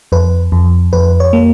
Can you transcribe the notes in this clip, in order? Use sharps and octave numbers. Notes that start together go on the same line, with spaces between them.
F2 B4
F2
F2 B4
C#5
A#3